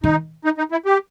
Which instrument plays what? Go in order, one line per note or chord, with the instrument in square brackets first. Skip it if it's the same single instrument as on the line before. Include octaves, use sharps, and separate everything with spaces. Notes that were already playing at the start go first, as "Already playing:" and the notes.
[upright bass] D#3 [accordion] D#4
[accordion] D#4
D#4
E4
G4